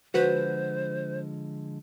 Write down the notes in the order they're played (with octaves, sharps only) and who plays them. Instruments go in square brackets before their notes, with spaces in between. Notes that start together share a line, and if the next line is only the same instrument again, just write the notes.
[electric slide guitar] D3 F3 G#3 [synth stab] F#4 B4 [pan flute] C5